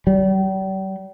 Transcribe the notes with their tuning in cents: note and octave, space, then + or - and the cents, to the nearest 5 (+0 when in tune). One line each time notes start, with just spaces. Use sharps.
G3 -45